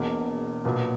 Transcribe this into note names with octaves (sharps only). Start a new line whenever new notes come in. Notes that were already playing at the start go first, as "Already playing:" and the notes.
Already playing: E1 E2 B2 A#3
B1 A#2 F#3 B3